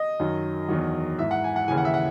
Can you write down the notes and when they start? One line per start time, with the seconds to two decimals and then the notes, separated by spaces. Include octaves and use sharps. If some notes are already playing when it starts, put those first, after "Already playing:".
Already playing: D#5
0.20 F#2 D#3 F#3
0.69 E2 D#3 F#3
1.19 G#2 E3 E5
1.31 F#5
1.44 G#5
1.56 F#5
1.68 D#2 C#3 E3 G#5
1.77 F#5
1.85 E5
1.94 F#5